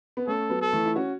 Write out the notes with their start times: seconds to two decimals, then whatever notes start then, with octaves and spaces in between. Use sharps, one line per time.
0.17 B3
0.27 A3 C#4 A4
0.50 F#3 B3
0.61 A4
0.73 E3 A3
0.85 E4
0.96 C#4 F#4